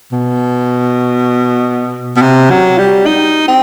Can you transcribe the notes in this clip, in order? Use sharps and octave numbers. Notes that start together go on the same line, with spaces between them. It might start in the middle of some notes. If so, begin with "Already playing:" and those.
B2
B2
C3
F#3
G3
D#4
C4